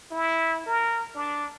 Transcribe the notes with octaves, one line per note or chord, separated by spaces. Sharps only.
E4
A#4
D4